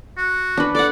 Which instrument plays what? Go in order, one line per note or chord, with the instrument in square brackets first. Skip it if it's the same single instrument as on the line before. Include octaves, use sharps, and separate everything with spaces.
[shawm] F#4
[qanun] D4 B4
[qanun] A4 F#5 [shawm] D5